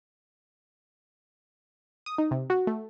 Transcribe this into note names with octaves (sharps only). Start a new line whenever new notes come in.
D#6
D#4
C3
F#4
A3